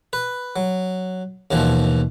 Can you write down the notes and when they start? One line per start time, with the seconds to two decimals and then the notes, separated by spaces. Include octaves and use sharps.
0.13 B4
0.56 F#3
1.51 D#2 B2 E3 F3